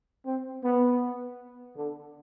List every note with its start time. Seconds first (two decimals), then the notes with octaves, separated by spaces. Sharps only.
0.25 C4
0.63 B3
1.76 D3